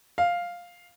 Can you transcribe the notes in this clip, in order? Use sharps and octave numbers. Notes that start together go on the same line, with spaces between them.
F5